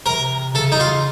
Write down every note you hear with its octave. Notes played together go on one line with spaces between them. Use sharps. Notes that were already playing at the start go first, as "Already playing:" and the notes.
C3 A#4
C#3 A4
D#4
C3
C#3 F4